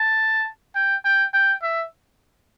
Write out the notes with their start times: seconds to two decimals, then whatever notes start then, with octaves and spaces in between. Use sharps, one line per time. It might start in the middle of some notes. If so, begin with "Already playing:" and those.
Already playing: A5
0.75 G5
1.05 G5
1.34 G5
1.63 E5